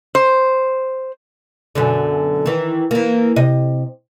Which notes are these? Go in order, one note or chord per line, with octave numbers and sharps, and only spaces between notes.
C5
F#2 B2 D3
D#3 E3
E3 A#3
C3 D#5